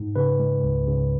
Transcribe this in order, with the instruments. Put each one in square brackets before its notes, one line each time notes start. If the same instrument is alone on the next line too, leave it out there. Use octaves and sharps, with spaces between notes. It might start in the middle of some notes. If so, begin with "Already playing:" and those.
Already playing: [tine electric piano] G#2
C#3 B4
G#3
C#2
C#3